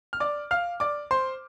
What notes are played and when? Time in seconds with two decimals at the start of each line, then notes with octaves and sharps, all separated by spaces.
0.13 F6
0.20 D5 D6
0.51 F5 F6
0.80 D5 D6
1.11 C5 C6